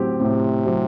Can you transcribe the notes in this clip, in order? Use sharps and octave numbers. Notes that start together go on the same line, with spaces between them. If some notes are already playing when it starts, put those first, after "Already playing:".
Already playing: A2 F#3 C4 G4
A2 C3
F#3 C4 G4